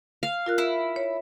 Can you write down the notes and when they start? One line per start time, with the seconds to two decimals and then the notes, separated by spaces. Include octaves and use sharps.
0.23 F5
0.46 F4 A#4 F#6
0.58 E4
0.96 C#5